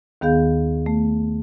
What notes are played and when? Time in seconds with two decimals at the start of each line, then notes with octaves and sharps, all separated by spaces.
0.21 D#2 D#3 B3 G#4 F5 G6
0.86 A3